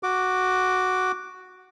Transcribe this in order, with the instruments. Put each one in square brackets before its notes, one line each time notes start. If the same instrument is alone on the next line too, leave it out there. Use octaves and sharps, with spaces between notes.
[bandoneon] F#4 D6